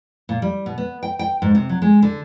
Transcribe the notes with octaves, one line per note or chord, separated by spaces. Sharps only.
A#2
G3
B2
B3
G5
G5
G#2
C3
F#3
G#3
D3